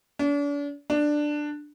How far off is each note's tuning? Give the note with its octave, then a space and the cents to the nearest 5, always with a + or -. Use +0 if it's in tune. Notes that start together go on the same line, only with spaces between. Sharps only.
D4 -40
D4 +10